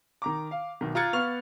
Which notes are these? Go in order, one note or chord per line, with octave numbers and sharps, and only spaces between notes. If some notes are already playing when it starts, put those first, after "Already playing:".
D#3 A#5 D6
F5
B1 D#3
F4 A#5 F#6 G#6 A6 C#7
B3 F5 C#6 F6 F7